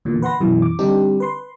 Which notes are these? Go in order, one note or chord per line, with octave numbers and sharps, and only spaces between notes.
E2 A#2 D3
B4 F#5 C6 A#6
F#2 B2 E3
D6
D3 G3 C4 D4 D#4 G4
B4 C6